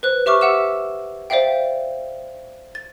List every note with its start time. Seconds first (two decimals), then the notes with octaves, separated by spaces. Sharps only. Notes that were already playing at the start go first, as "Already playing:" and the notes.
0.03 B4 C5 F#6
0.26 G4 E5 C#6 D6 F6
0.41 G4 E5 F#5 E6 E7
1.30 C5 D5 E5 F5 G5
2.75 A6